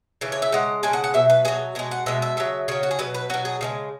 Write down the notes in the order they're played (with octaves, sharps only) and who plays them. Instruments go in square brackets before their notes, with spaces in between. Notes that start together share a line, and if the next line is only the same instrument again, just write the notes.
[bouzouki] C#3 E3
C#5
E5
C#3 G#3 F#5
C#3 G#3 G#5
F#5
F#5
B2 F#3 E5
B4
B2 F#3 G#4
B2 G#3 G#4
F#5
B2 G#3 E5
E5
C#3 F#3 E5
C#3 F#3 C#5
F#4
G#4
B2 F#3 B4
B4
B2 F#3 F#4
G#4
C#3 E3 G#3